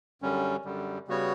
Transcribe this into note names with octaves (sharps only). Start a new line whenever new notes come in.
F#2 D3 G3 C#4
F#2 D3 G3
C#3 G3 B3 F#4 C#5